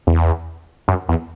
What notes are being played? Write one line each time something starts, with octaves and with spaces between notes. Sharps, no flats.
E2
F#2
E2